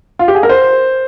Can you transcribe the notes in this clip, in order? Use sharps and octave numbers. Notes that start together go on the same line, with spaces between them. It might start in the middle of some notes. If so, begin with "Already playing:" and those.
F4
G4
G#4
A#4
C5